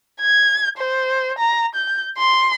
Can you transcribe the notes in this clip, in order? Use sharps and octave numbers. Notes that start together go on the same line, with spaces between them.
G#6
C5
A#5
G6
C6